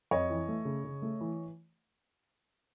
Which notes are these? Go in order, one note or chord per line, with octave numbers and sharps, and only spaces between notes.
F2 C#5 D#5
E3
A3
C#3
C#3
A3
E3